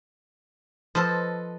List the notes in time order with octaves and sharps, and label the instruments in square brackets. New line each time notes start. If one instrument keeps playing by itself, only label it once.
[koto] F3 C5 [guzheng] A4 B4 D#5